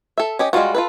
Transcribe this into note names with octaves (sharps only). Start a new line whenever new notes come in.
A4 E5
C#4 G4 D#5
G3 G#3 D#4 F4 F#4
F4 A4 B4